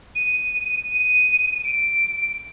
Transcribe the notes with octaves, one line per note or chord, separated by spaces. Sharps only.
D#7
D#7
D7